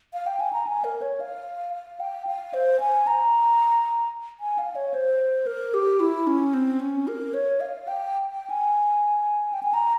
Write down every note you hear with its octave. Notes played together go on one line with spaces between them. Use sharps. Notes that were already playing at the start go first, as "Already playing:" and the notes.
F5
G5
G#5
A#5
G#5
A#4
C#5
F5
F5
G5
F5
C5
G#5
A#5
G#5
F5
C#5
C5
A#4
G4
E4
C#4
C4
C#4
A#4
C#5
F5
G5
G5
G#5
G5
G#5
A#5